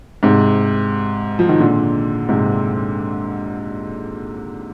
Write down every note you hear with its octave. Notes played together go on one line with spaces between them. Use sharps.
G#2 C3
F3
D#3
A#2 D3
G#2 C3